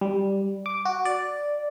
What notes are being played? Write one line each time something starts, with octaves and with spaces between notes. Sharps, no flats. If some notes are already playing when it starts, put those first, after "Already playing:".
G3
D6
F#4
D5